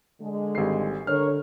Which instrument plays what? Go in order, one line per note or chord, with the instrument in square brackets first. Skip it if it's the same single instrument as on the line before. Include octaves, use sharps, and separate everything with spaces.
[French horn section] D3 G#3
[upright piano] G#1 G3 C7
[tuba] D3 [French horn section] A#4 C#5 [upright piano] F6